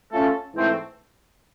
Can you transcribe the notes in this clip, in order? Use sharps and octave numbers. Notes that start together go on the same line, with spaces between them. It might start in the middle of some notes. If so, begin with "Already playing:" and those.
A3 C#4 F4 A4
G#2 E3 A3 C4